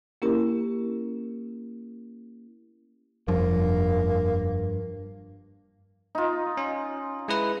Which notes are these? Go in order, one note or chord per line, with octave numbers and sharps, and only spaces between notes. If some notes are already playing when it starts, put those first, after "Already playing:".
A#3 C#4 E4 G4 A#4
F1 G2 F3 A#3
D#4 F4
C#4
G#3 E4 B4